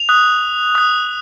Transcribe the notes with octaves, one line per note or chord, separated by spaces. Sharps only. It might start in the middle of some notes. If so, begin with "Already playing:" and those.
Already playing: F7
D#6 F#6
D#6 F#6